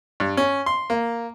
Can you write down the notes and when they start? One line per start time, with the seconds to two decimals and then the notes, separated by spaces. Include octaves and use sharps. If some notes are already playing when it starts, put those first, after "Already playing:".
0.20 G2
0.37 C#4
0.66 C6
0.90 A#3